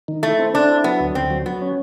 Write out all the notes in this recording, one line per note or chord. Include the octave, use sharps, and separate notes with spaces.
D#3
A3 E4
C4
C4 D4
E4
F#3 B3
D2
D2 C4
F#3
F#3 B3
C#4